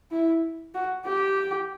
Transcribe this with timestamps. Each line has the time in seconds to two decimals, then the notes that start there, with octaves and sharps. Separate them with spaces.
0.11 E4
0.74 F#4
1.06 G4